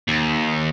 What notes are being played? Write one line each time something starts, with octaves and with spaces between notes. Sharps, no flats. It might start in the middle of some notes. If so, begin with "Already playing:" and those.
D#2